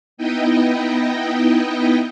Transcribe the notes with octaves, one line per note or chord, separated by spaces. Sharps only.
B3 D#4 E4 D#5 G5